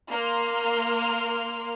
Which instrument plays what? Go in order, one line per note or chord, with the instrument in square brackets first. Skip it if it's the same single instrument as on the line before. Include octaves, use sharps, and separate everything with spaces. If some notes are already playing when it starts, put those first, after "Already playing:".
[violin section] A#3 C6 F6